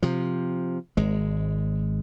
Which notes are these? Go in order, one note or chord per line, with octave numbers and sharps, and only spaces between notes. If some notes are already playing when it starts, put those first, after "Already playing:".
C3 F3
G#1 G#3